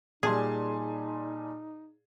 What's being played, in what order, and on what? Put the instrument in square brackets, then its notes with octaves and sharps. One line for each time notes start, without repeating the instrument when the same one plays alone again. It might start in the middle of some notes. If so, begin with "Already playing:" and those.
[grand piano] A#2 G3 [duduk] D#4 [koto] G#4 [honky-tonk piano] G#5 A5 C6